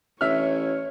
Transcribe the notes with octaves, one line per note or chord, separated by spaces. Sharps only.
A1 C#5 E5 F6